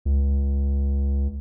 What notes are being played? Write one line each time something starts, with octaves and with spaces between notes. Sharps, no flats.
C#2